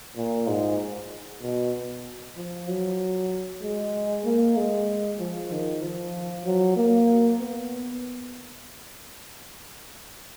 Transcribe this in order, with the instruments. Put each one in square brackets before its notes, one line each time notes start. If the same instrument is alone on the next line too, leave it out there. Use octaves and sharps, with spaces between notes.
[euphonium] A#2
G#2
B2
F3
F#3
G#3
A#3
G#3
F3
D#3
F3
F#3
A#3
B3